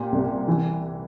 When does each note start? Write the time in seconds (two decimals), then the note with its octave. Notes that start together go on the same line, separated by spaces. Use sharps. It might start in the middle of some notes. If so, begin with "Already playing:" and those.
Already playing: A#2 G4
0.12 C2
0.48 E3